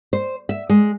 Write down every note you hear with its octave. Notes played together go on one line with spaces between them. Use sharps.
C5
E5
G#3